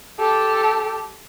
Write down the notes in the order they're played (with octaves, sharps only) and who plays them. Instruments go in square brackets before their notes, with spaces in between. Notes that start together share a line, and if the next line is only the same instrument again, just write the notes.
[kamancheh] G4 A4